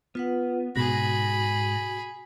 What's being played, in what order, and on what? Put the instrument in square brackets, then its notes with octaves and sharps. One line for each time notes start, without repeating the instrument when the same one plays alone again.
[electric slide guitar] B3 [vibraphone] F4 B4 F#5
[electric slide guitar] G#2 [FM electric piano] B2 A#6 [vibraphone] F#4 [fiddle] G#4 B5